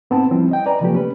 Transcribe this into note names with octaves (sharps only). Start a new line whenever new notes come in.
G#2 B3 C4 D#4 A5
F3 G3 C4 C#4 E4
D#5 G5
B4 D5 G#5 A#5
C3 F3 F#3 A3 A#3 G4
C#4 B4